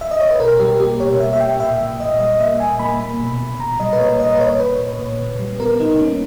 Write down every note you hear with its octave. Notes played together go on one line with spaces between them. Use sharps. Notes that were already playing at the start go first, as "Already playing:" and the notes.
E5
D#5
C#5
B4
B2 A#4
G3 G4
A#3 G4
B2 C#5
A#3 E5
E5
A#3 G5
A#2 E5
A#2
A#2 D#5
G3 D#5
A#3 E5
A#2 G#5
A#3 B5
A#3
B2
B2
A#2 A#5
G3 D#5
B4
A#3 C#5
A#2 D#5
B4
A#3 C#5
A#3 B4
A#2
A#2
C#3
G3
B3 A#4
C#3 D#4
A#3 C#4